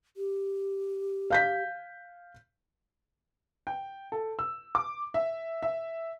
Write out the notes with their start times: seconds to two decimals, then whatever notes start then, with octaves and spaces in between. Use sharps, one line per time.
0.17 G4
1.30 F5 G6 B6
3.67 G5
4.12 A4
4.39 E6
4.75 D6
5.14 E5
5.63 E5